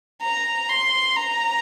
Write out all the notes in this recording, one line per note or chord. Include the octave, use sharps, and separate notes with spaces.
A#5
C6
A#5